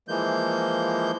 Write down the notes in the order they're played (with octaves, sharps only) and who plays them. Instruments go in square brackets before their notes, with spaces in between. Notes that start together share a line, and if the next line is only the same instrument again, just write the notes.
[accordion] E3 F3 G#3 A#3 G6